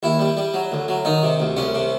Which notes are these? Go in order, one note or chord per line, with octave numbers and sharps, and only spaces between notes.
D#2 E4
G3
G3
F#3
D2
F#3
D#3 D#4
C3
D2
C2 C#4
C3